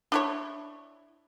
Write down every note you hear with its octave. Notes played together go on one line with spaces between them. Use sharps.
D4 E4 C#5